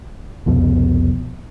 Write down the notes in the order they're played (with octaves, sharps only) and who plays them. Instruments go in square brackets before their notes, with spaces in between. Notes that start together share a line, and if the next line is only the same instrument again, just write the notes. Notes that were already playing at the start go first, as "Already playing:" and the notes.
[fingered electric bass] C2 F2 B2